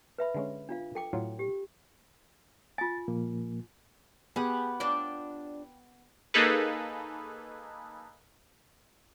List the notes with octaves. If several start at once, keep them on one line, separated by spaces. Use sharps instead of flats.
B4 E5 B5
D3 G#3 C#4
D4 F4 F5
A4 G5 D6
A2 F#3 F4
G4
F4 G#5 A6
A#2 F3 A#3
B3 G4 G#4 F#5
D4 F4 D5 G5
A#3 D#4 G#4 A4 B4